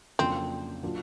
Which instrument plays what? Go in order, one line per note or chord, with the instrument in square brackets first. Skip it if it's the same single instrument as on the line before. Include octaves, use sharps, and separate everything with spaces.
[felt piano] F2 C#3 F#3 A#3 D4 [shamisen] C4
[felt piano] A#2 F#3 A#3 D4 F4